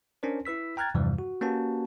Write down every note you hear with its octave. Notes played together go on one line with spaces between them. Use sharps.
C#4 D4 A#4 C5
E4 B4 E6 B6
G5 A#5 F6 F#6 G#6 A6
E2 G2 C3 E3 F3 G3
F#4
A#3 C#4 F#4 G4 B4 A5